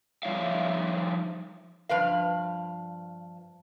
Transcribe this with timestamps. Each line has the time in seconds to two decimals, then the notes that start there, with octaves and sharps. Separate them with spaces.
0.23 F3 G3 D#4 C#5 E5 F5
1.89 G2 F3 B4 F5